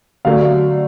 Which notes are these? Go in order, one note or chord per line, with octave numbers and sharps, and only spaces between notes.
D3 F#3 A3 F5